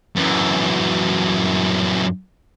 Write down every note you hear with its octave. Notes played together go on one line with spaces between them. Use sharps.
F#2 E3